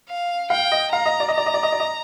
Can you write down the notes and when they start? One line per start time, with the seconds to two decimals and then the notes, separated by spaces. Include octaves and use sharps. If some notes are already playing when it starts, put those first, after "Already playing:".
0.09 F5
0.50 F5 G5
0.72 D#5
0.92 F5 A#5
1.06 D#5
1.20 D5
1.28 D#5
1.34 D5 A#5
1.46 D#5
1.54 D5
1.63 D#5
1.72 D5
1.80 D#5